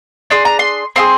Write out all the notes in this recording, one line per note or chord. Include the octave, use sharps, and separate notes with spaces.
D4 G#4 C6
A#5
C6
C4 F4 G#4 C6